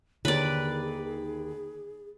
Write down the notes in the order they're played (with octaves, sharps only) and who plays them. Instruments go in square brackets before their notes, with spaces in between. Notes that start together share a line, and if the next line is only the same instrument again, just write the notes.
[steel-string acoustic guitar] D#2 D#3 G4 [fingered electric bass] D3 [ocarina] G#4 [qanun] B4 D5